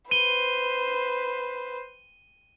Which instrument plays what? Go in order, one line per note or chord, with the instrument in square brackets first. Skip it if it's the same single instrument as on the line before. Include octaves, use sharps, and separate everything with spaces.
[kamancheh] B4 C5 [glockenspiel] D#7 G7